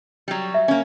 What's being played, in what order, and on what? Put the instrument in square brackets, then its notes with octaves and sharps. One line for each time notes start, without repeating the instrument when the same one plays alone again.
[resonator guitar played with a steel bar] F#3 G3
[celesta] E5
[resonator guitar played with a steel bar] A#3 C#4